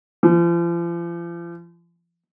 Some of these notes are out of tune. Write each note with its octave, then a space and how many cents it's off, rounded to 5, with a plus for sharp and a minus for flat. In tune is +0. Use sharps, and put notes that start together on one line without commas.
F3 -40